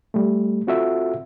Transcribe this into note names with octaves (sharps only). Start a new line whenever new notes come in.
G3 A3
C4 F4 F#4 A4 E5